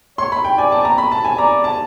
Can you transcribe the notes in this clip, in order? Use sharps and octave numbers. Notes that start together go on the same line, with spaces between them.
C#5 C6
B5
G5
D5 G#5
A5
A#5
B5
A5
G#5
D5 A#5
A5